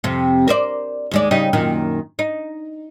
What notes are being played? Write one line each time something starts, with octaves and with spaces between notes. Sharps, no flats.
F2 C3
A#4 C5 D5
D#2 G#3 D5
C#3 G3 D#4
F#2 A#2 D#3
D#4